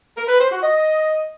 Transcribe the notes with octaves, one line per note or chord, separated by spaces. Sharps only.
A#4
B4
C5
F#4
D#5